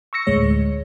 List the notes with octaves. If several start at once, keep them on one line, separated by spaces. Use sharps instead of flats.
C#6 E6 A#6 C#7
D2 A2 G#3 C#5